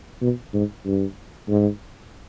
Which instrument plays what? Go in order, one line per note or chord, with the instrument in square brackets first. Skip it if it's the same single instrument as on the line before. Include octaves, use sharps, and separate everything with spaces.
[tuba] B2
G#2
G2
G#2